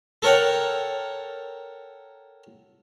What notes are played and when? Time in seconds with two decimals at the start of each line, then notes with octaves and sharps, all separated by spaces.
0.22 A4 A#4 C#5 F#5 G5